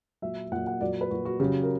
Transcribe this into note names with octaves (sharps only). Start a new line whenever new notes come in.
A#2 F#3 E5
A#2 F#3 F#5
F#5
A#2 F#3 D5
B4
A#2 F#3 F#4
F#4
C#3 F#3 G4
A#4